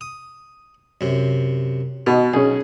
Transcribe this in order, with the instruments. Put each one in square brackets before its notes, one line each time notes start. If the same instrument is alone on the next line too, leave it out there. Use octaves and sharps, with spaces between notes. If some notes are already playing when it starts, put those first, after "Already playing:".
[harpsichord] D#6
F#2 C3
[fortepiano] B2 [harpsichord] D#4
[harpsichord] B1 [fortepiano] C#4 G#4